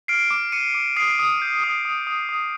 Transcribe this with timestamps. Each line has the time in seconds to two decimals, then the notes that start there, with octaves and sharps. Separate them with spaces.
0.08 F6 C7 D7
0.31 D6
0.52 D6 C#7 D#7
0.74 D6
0.96 D#6 C7 D7
1.19 D#6
1.42 G6
1.64 D#6
1.85 D#6
2.07 D#6
2.29 D#6